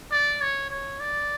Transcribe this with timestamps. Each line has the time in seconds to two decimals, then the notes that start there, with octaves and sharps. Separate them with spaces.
0.12 D5
0.41 C#5
0.70 C#5
1.00 D5